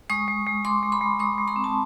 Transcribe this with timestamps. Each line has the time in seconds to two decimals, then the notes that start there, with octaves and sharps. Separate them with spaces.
0.10 G#3 C#6 D#6
0.28 G#3
0.47 G#3
0.65 G#3 C6 D6
0.83 G#3
0.92 B5 C#6
1.01 G#3
1.19 G#3 C#6 D#6
1.38 G#3
1.47 A#5 C6
1.56 C4
1.64 A5